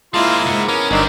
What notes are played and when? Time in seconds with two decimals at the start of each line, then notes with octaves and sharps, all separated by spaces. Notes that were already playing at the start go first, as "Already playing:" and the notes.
0.14 G#3 A#3 C4 E4 F4 D#5 A5
0.46 C2 G#2 F#5
0.68 B3 C#4 A#4
0.91 G1 F#3 B3 C4 D4 D#4 A#4